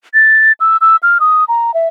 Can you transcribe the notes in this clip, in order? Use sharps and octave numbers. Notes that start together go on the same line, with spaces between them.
A6
E6
E6
F6
D#6
A#5
E5